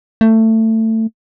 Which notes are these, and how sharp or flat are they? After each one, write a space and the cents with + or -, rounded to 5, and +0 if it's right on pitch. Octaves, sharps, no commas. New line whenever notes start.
A3 +20